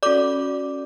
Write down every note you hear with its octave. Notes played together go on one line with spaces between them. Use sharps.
C#4 F#4 A4 D5 D6